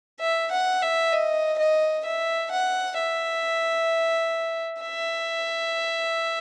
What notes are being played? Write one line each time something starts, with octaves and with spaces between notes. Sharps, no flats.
E5
F#5
E5
D#5
D#5
E5
F#5
E5
E5